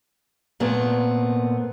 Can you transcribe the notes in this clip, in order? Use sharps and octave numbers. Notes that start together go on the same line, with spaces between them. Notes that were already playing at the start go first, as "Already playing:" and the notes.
A#2 A3 B3 C4